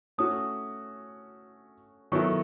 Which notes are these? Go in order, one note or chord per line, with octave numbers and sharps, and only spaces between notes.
A3 C#4 F#4 D#6
D#3 F#3 B3 E4 A4 C#6